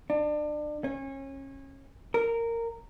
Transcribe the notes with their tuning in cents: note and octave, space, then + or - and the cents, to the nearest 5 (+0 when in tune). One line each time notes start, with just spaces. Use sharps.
D4 +30
C#4 -30
A#4 -15